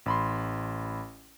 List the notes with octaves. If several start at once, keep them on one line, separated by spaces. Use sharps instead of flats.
A1 B5 C6